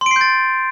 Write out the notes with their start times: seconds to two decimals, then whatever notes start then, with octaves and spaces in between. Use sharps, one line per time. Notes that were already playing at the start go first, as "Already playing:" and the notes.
0.01 C6
0.06 D7
0.11 C7
0.16 G6
0.21 A6